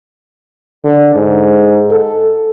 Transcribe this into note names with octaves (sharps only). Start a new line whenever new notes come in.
D3
G#2
A4